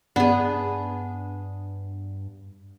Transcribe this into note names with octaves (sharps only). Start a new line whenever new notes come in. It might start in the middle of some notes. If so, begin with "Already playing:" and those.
G2 B3 D4 G#4